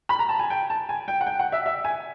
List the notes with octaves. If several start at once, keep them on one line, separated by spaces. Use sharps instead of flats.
B5
A#5
A5
G#5
G5
A5
G#5
G5
F#5
G5
F#5
E5
E5
G#5